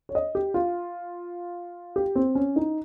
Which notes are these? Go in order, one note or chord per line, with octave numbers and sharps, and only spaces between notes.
C#5
D#5
G4
F4
G4
C4
C#4
D#4